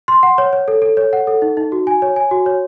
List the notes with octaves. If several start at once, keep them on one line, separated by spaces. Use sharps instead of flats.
C6
F#5
C#5
C#5
A4
A4
C#5
F#5
A4
D#4
D#4
F#4
G#5
C#5
G#5
F#4
C#5